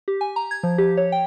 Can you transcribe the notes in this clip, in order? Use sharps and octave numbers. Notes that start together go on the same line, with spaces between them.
G4
G#5
A#5
G#6
F3
G4
C#5
G5